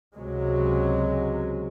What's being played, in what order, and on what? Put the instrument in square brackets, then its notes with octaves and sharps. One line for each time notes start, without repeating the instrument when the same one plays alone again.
[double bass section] C#2 C3 F#3 G#3